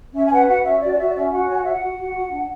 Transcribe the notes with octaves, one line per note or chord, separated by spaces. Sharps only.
C#4 E5
G#5
B4 F#5
F#4 F#5
C#4 E5
F#4 D5
D5
F#4 E5
D5
C#4 E5
F#4 F#5
C#5 G#5
F#5
F#4 E5
F#5
F#4
F#4
F#4
D4